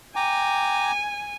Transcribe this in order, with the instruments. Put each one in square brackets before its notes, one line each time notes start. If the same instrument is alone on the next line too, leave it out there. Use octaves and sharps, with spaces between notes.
[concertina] G5 A#5 D6 [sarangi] G#5